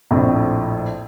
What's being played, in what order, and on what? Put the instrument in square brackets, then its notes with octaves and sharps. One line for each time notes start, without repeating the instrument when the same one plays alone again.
[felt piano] A#1 F2 A2